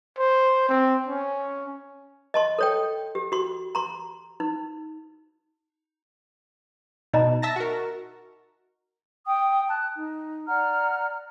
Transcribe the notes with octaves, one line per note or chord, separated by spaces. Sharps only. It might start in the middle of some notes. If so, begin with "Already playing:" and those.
C5
C4
C#4
D#5 A5 C6
A4 C#5 G5
G4
F#4 C6
A#5 C6
D#4
B2 D#4 D#5 A#5
E5 A5 A#6
F#4 A#4
G5 D#6
A5 F#6
D#4
D5 F#5 A#5 F6